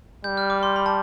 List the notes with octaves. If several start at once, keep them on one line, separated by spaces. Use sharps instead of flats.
G3 G6
F6
D6
C6
B5
A5